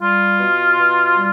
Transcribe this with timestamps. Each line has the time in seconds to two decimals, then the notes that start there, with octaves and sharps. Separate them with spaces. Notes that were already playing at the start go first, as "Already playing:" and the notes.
0.01 G3 F4
0.39 B2
0.78 B2
1.16 G3